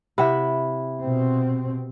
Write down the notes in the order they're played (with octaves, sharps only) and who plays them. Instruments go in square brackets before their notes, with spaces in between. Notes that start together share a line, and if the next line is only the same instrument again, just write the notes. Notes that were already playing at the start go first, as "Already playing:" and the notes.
[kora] C3 [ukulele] E4 F#5 B5
[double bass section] B2 C4